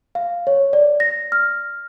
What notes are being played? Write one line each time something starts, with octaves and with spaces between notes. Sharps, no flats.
F5
C#5
D5
A#6
F6